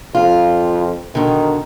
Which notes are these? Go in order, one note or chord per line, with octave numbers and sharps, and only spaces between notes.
F2 F4
B2 D3 D#3